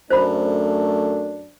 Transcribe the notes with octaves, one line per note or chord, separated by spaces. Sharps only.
F#2 A3 D4 C5 B5